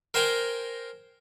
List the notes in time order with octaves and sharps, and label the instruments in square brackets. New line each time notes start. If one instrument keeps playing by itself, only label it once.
[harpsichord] A#4 C5 G5 G#5 A#5